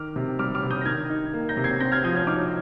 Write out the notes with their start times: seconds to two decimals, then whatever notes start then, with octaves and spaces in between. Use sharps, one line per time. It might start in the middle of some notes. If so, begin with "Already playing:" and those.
Already playing: D#3 D6 F6
0.16 C3
0.39 G3 D6 F6
0.55 D6 F6
0.63 C3
0.70 D#6 G6
0.81 A#6
0.85 D#3 F6 G#6
1.10 D#4
1.34 A#3
1.49 G6 A#6
1.57 C3
1.64 G#6 C7
1.80 C4 G6 A#6
1.92 F6 G#6
2.04 F3 D#6 G6
2.15 F6 G#6
2.27 D#4 D6 F6